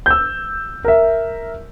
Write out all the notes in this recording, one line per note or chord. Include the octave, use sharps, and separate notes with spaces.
E6 G6
A#4 E5